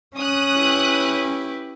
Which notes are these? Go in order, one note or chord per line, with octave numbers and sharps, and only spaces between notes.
C#4 D#6 F#6
E4 G4 B4